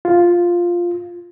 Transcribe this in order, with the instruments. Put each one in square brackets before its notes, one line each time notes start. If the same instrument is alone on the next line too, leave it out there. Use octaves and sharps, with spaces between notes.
[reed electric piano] F4